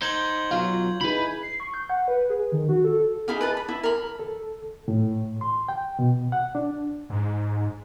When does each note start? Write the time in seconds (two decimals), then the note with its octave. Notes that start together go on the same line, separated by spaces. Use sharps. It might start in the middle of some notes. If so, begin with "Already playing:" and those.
0.01 D#4 C5 G6 G#6 F#7
0.51 B1 F#3 F4
1.01 D#4 E4 G#4 B4 B5
1.43 C7
1.60 C#6
1.74 G6
1.90 F#5
2.08 B4
2.30 G#4
2.52 D#3
2.69 F#4
2.84 A4
3.28 D#4 E4 G#4 F5
3.41 B4 D#5 A5
3.57 B5
3.68 E4
3.83 A#4 B5
4.19 A4
4.88 A2
5.41 C6
5.68 G5
5.99 B2
6.32 F#5
6.55 D4
7.10 G#2